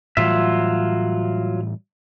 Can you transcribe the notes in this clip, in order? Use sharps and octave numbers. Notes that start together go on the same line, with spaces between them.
A2 E3 F#3 G3 F4 E5